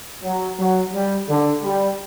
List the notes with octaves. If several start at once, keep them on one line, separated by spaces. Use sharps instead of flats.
F#3
F#3
G3
D3
G3